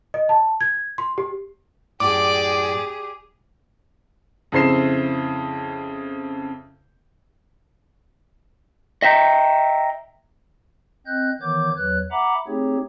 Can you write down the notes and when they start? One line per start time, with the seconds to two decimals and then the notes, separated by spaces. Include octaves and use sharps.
0.14 D#5
0.29 A5
0.61 G#6
0.98 C6
1.18 G4
2.00 F#2 A2 G4 G#4 D5 D6
4.52 F2 C#3 E4 C5 C7 E7
9.02 D#5 E5 G5 A#5
11.06 C4 D#5 F#6 G6
11.41 D#3 E3 B3 C#5 D6 G6
11.76 E2 F#3 B4 C#5 F#6
12.11 E5 F#5 A#5 B5 D6
12.48 A3 C4 D#4 G4 G#4 C#5